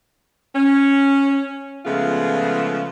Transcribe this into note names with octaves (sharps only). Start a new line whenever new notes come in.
C#4
C#3 F3 G#3 A3 B3 F4